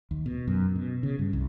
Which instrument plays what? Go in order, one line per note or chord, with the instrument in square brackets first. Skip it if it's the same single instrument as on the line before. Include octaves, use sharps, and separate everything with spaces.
[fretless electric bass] D#2
B2
F#2
B2
C#3
G2
C2